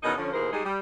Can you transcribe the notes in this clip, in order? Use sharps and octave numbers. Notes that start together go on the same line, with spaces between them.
E2 B2 D#3 C#4 D#4
D3 F3 C#4
D#2 B2 E3 G#4 A#4 C5
G3 G#3 D#4 G#4
G3